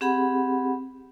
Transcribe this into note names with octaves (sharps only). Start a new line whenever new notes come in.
C4 G4 G#4 F#5 B5